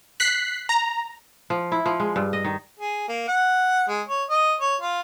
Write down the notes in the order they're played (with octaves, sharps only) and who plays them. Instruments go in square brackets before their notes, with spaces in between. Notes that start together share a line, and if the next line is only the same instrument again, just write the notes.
[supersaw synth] F#6 B6 C7
A#5
[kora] F3
E4
F3
G#3
G2
D#5
D#3
[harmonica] G#4
A#3
F#5
G#3
C#5
D#5
C#5
F4